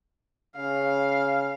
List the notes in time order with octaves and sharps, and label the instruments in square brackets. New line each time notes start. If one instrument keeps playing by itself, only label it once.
[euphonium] C#3 [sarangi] F5